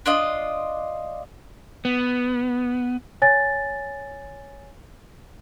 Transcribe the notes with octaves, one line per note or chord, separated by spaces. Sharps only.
D4 F4 D#5
B3
C#5 G#5 A6